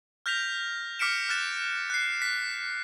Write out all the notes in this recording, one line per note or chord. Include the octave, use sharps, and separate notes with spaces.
F6 G6 A#6 B6 F7
D6 F6 B6 C#7 D7 E7
F6 F#6 A6 E7
F#6 C7
B6